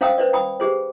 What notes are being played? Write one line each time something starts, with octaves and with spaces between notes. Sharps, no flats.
C#4 C5 F5 G5 D#6 E6
B4 C5 D5
G5 B5 D#6
G4 G#4 C5